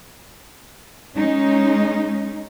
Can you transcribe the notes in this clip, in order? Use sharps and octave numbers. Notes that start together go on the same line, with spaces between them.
G#3 C#4 D#4